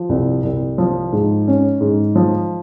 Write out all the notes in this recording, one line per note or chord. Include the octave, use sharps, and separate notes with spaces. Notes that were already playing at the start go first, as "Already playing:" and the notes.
Already playing: F3
C2
C2
F3
G#2
C#4
G#2
F3